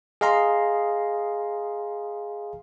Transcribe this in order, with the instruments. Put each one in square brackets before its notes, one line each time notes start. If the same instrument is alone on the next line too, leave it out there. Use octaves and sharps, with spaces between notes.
[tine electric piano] G#4 D#5 F5 A#5 C6